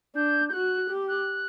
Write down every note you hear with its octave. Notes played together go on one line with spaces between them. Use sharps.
D4 G6
G6
F#4 F#6
G4
F#6